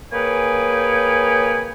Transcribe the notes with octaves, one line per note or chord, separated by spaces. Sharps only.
A#3 G#4 B4 C#5 G5 G#5